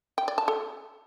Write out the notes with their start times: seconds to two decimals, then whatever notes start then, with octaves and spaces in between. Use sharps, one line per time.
0.18 G5
0.28 D5
0.38 A5
0.48 A4